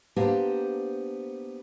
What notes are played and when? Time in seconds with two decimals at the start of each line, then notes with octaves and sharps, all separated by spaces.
0.16 A#3 B3 D4 G4 C5 A#5